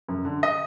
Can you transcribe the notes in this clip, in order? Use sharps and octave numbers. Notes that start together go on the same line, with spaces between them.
F#2
D3
D#5